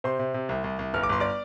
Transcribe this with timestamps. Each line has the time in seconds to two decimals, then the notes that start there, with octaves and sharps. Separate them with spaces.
0.04 C3 C5 C6
0.19 C3
0.34 C3
0.49 C2
0.64 C2
0.79 C2
0.94 G1 F6
1.03 D6
1.09 G1 C6
1.20 D5 D6